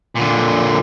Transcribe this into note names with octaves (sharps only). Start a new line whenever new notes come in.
A#2 D3